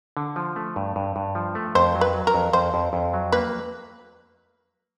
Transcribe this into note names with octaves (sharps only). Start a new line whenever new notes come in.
D3
F3
A3
G2
G2
G2
F3
A3
F2 C5
F#3
B4
F#3
A#4
F2
F2 C5
F2
F2
F#3
A#3 B4